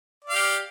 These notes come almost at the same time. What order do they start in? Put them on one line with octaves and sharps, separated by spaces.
D5 F5 G4